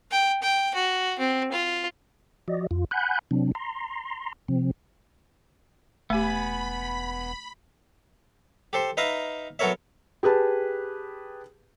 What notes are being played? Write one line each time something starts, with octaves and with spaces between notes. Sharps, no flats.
G5
G5
F#4
C4
F4
F3 F#4 D5 D#5
F2 F4
F#5 G#5 B5 F#6 G6
C3 F#3 C4 D4
A#5 C6
C3 F3 C4
E1 A3 B3 G4 G#5 B5
G4 A4 C5
D#4 B4 E5 F5 A#5
F#3 B3 A4 A#4 C#5 E5
G4 G#4 B4 A5